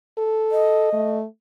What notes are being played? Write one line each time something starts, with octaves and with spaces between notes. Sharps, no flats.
A4
D#5
A3